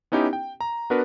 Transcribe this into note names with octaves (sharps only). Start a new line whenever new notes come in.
B3 C#4 D#4 E4 G4
G5
A#5
B3 D4 F#4 A#4 B4